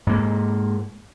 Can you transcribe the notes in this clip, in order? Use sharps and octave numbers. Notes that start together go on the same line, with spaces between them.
G#2 A#3